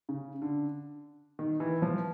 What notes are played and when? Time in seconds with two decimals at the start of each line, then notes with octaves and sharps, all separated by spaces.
0.09 C#3
0.42 D3
1.39 D#3
1.60 E3
1.82 F3